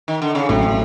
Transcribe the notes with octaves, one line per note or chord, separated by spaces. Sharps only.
D#3
D3
C#3
A1 A2 C3 F#3